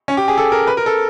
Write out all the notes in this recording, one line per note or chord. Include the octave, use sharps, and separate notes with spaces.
C#4
G4
G#4
A4
A#4
B4
A#4
A4